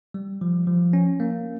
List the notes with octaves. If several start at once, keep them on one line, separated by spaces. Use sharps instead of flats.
G3
F3
F3
C#4
A#3